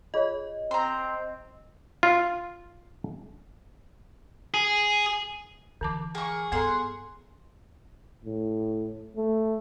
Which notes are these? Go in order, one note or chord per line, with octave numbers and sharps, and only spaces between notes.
F4 G#4 C#5 D#5
C4 A#5 C6
F4
G#4
D3 E3 A5 D6
A#3 G#4 C#6
G2 B3 A4 F#5 A#5 C6
A2
A3